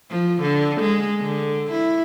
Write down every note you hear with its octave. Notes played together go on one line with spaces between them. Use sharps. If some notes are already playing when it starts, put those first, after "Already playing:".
F3
D3
G#3
D3
E4